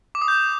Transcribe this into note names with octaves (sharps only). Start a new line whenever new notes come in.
D6
D#6
G6